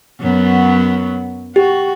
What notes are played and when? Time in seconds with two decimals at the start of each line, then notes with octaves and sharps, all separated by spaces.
0.21 F#2 F#3 B3
1.56 F#4 G4